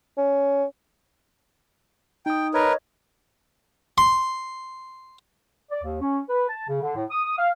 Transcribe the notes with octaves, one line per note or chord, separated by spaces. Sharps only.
C#4
D#4 G5 D#6
A#4 B4 C#5 D#5 G#6
C6
D5
D#2
C#4
B4
A5
C#3
D3
A2
D#6
D#6
F5